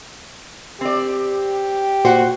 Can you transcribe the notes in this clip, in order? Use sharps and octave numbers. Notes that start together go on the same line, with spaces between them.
C4 G4 D5
A#2 F#4 C5 F#5